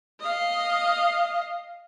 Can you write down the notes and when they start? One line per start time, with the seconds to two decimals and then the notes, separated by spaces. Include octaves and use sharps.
0.20 D#5 F5